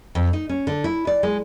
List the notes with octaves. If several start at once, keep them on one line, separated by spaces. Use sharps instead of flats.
F2
D#4
C#4
D3
E4
D5
G#3